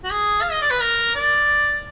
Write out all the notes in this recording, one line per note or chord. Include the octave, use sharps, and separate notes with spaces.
F#4
G#4
F5
D#5
D5
B4
A#4
D5